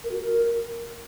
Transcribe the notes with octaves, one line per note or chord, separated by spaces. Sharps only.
A#4
F#4
A#4